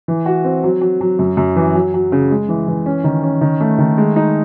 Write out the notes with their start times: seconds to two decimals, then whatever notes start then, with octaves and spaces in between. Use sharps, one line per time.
0.08 E3
0.26 F#4
0.44 C4
0.64 F#3
0.81 F#3
1.01 F#3
1.19 F#2
1.37 F#2
1.56 E3
1.75 F#3
1.94 F#3
2.12 C#3
2.31 G#3
2.49 E3
2.68 E3
2.86 C#4
3.04 D#3
3.23 C#4
3.41 D#3
3.61 A3
3.79 D#3
3.98 G#3
4.16 D#4